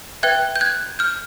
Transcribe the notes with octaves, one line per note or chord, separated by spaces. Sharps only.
B4 E5 G5 F#6 G#6
G6
F#6 G#6
F6 G6